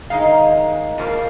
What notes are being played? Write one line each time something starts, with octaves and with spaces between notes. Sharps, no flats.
D#3 G#3 D#4 F5
F2 F3 A#3 F4